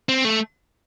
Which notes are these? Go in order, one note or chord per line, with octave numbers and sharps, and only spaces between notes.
C4
A3